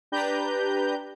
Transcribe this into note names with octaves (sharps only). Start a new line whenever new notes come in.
D4 G4 B4 A#5 G6